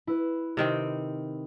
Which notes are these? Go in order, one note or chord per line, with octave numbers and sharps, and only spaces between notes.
E4 B4
C3 D#3 C4